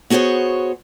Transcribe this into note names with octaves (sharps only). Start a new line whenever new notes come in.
B3 F#4 G#4 C5 C#5